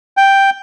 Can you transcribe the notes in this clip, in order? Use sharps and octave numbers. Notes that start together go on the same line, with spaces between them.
G5